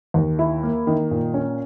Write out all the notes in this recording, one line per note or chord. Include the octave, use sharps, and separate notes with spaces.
D#2
E4
A#3
D#3
A#2
C#4